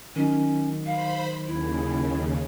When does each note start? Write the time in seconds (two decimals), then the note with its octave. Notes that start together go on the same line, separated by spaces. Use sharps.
0.16 D#3 F#3 C#4 D#4
0.86 C5 F5 B5
1.47 D#2 C#3 E4